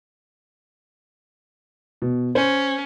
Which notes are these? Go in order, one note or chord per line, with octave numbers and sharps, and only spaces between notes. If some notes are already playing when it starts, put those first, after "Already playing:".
B2
C#4 C5